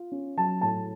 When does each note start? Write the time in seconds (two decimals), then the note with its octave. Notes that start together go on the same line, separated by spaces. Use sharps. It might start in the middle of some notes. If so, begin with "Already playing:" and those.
Already playing: F4
0.12 C#4
0.37 F#3 A5
0.61 A2 A5